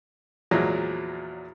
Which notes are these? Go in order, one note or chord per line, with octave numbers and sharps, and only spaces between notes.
E2 A#2 F3 F#3 G#3